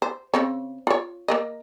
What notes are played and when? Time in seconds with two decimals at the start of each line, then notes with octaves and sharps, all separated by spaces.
0.02 C5
0.34 C#3 C4 C#5
0.87 F4 C#5
1.28 A#3 A#4 D#5